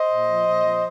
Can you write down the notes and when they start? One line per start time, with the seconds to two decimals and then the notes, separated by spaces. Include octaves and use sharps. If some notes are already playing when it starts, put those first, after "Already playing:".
Already playing: C5 D#5
0.09 A#2
0.27 F3
0.47 A#2
0.65 F3